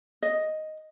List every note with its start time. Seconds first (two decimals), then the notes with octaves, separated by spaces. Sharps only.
0.22 D#5